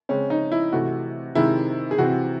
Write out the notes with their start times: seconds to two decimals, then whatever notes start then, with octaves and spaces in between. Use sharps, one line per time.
0.09 C#3 G#3 C4 C#4
0.30 D#4
0.52 E4
0.72 C3 E3 A3 F#4
1.35 C3 D#3 G#3 C4 E4
1.91 G#4
1.98 C3 E3 C4 F#4